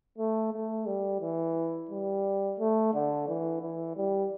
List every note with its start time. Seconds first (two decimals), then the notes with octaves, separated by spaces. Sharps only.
0.18 A3
0.53 A3
0.86 G3
1.21 E3
1.91 G3
2.59 A3
2.94 D3
3.28 E3
3.62 E3
3.97 G3